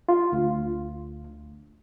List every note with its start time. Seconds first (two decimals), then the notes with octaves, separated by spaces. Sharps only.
0.09 F4
0.32 D2